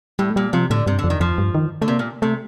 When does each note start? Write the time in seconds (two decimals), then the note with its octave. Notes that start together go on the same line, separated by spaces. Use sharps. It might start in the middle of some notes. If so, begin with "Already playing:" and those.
0.19 A2 G3
0.30 A3
0.36 A#2 G3
0.53 C3 F3
0.70 A2 D3
0.87 G2 C3
0.99 D3
1.04 F2
1.10 D#3
1.20 F2 F3
1.38 G2
1.55 D#3
1.82 D3 A3
1.88 C3 A#3
1.99 A#2
2.22 C3 A3